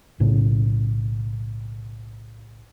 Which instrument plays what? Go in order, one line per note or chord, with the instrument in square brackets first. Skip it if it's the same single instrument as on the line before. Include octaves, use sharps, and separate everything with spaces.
[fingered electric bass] B1 A2 C#3